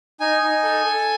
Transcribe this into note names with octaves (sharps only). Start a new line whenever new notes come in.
D#4 G#5
D#4
A4
A4